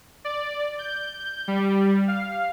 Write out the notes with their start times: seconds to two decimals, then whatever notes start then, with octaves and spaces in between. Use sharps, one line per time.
0.25 D5
0.79 G6
1.48 G3
2.08 F5